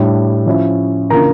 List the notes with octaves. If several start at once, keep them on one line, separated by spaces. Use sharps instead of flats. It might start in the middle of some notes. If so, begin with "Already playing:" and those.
Already playing: A2 G3 D4
F3 C#4 E4
C#3 E3 A#3 D4 F4 A#4 A#5